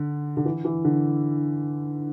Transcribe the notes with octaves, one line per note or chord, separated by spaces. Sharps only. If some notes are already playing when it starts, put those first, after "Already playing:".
Already playing: D3
D3
E3
E3
D3